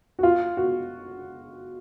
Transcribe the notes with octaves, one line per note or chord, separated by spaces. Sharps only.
F#4
F4
F#4